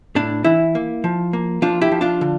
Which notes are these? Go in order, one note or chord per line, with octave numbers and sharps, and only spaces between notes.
A2 D4
E3 E4
A#3
F3
A#3
F3 D4 F4
E4 G4
F3
D4 F4
D3